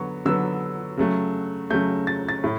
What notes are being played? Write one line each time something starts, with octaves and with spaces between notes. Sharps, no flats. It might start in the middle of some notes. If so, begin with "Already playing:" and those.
Already playing: D3 F#3 B3 C#6
D3 F#3 B3 E6
C#3 F#3 A3
C#3 F#3 A3 G6
A6
A6
A2